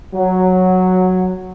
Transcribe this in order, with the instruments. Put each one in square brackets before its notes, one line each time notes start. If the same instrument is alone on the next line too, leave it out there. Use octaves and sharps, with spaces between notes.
[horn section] F#3